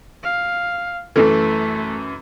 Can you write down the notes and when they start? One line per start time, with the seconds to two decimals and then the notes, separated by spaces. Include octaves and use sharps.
0.23 F5
1.16 F#2 E3 A3 A4